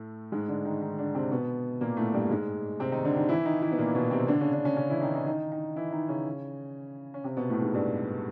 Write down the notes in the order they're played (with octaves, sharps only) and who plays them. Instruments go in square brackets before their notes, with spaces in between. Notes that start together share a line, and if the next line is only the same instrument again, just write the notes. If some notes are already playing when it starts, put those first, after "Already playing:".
Already playing: [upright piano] A2 A3
G#2 G#3
D3 D4
D#3 D#4
D#3 D#4
D3 D4
C3 C4
B2 B3
A#2 A#3
A2 A3
G2 G3
G#2 G#3
C3 C4
D#3 D#4
D3 D4
D#3 D#4
E3 E4
D#3 D#4
E3 E4
B3
A#2 A#3
B2 B3
C3 C4
D3 D4
C#3 C#4
D3 D4
C#3 C#4
C#3 C#4
E3 E4
D#3 D#4
D#3 D#4
D#3 D#4
D#3 D#4
E3 E4
D#3 D#4
C#3 C#4
C#4
C3 C4
B2 B3
A2 A3
G#2 G#3
G2 G3